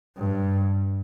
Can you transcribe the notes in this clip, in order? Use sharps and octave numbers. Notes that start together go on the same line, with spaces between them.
G2